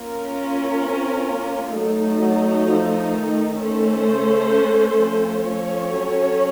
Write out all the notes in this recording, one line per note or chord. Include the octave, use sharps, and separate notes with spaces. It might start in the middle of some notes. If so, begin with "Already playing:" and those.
Already playing: A#3 C#4 F4 A#4
A#3
C4
A#3
F#3 A3 D#4 A4
F#3
F3
D#3
D#3 A3 C#4 A4 C5
C#3
F3
F3 C#4 A4 C#5
F#3